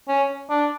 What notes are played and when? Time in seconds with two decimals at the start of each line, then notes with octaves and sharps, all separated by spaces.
0.08 C#4
0.50 D4